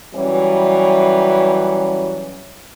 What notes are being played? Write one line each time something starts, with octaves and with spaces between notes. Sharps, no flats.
E3 F#3 G3 C#4